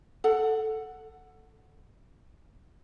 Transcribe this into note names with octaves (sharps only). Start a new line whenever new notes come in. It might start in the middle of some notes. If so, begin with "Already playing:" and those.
A4 F#5